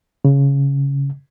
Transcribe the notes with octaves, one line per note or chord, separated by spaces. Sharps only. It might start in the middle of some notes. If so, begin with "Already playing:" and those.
C#3